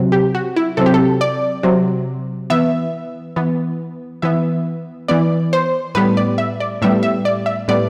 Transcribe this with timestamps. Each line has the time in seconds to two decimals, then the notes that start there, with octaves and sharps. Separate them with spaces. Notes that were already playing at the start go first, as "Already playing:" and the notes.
Already playing: C3 F#3 C4
0.12 G4
0.35 F#4
0.56 E4
0.77 C3 F#3 C4 A4
0.86 G4
0.94 A4
1.21 D5
1.63 C3 F#3 C4
2.50 E3 B3 E5
3.36 E3 B3
4.22 E3 B3 E5
5.08 E3 B3 D5
5.53 C5
5.95 A2 G3 B3 B4
6.17 D5
6.38 E5
6.60 D5
6.82 A2 G3 B3 E5
7.03 E5
7.25 D5
7.46 E5
7.68 A2 G3 B3 D5